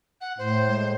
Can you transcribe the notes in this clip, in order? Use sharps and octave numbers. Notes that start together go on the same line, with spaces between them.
F#5
A2 C5
G#3